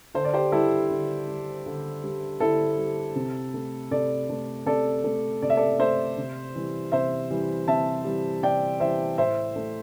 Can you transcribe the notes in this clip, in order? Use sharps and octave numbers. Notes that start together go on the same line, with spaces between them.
D3 C5
D5
G4 C5
G3 E4 A4
D3
G3
D3
G3
D3 E4 A4
G3
C3
A3
C3 A4 D5
A3
C3 A4 D5
A3
C3 D5
E5
A4 D5
A3 C5 E5
C3
E3 G3
C3 C5 E5
E3 G3
C3 E5 A5
E3 G3
C3 D5 G5
E3 G3 C5 E5
A2 C5 E5
A3